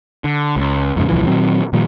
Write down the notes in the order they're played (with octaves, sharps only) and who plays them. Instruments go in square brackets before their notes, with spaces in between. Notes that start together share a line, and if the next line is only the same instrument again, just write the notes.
[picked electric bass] D3
C#2
F2 G#2 C#3
D#1 C2 E3 F3
A#2 D#3 F#3 C4
A#2 D#3 F3 G3